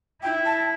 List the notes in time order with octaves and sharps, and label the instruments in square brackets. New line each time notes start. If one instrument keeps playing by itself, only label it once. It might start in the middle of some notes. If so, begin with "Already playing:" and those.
[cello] E4 [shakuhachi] G5
[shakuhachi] A5